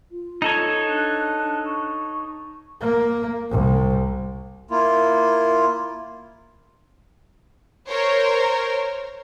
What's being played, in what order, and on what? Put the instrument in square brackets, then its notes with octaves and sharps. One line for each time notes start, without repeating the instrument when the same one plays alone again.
[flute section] F4
[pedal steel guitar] D#4 A4 C#5
[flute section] D4 F#6
C#6
[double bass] A#3
C2
[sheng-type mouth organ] A#3 E4 F4
[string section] A#4 C5 C#5